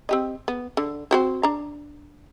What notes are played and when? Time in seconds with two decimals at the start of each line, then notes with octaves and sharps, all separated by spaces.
0.09 C4 G4 D#5
0.48 B3
0.77 D3
1.11 C4 F#4 C5
1.43 D4 A#5